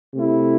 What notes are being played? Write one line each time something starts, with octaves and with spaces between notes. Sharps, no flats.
C3 A3 E4